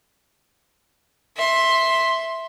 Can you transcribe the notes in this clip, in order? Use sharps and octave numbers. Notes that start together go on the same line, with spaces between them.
E5 C6